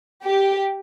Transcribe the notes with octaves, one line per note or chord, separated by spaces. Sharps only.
G4